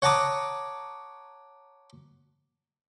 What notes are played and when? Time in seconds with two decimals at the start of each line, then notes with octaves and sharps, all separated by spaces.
0.02 C#5 F#5 A5 A#5 D6 D#6